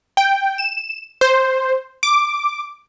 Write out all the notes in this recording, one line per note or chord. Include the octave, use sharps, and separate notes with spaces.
G5
E7
C5
D6